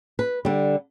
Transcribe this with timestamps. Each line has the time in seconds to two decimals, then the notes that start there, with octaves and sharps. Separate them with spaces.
0.19 B4
0.45 D3 G3